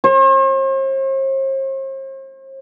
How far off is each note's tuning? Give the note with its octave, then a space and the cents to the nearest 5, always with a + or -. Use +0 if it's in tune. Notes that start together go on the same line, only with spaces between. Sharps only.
C5 +45